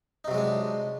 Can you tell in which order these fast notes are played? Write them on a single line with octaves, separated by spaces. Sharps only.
D#4 C3 F#3 G#3 D4